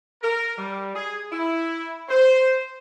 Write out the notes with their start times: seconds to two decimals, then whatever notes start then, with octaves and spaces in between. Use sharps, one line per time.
0.22 A#4
0.57 G3
0.95 G#4
1.32 E4
2.09 C5